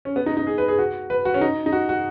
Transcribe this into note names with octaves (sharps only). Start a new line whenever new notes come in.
C#4
B3
D#4
D#4
G#4
B4
G#4
F#4
B4
F#4
C#4
D#4
D#4
F#4
F#4